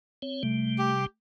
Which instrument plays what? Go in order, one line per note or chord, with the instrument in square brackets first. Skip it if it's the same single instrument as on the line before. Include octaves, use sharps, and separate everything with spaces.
[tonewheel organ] C4 C#5
[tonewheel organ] C3 G3 [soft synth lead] A3
[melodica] G4